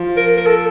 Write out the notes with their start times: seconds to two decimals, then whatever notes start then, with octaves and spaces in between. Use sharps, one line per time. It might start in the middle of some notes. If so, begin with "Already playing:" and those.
Already playing: F3
0.17 A#4
0.37 A#4
0.46 A4